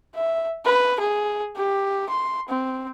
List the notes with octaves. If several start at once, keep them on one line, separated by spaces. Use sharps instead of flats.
E5
B4
G#4
G4
C6
C4